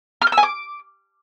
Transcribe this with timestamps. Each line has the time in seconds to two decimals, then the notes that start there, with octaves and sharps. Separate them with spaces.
0.22 F6
0.27 G6
0.32 E6
0.38 G#5
0.43 D6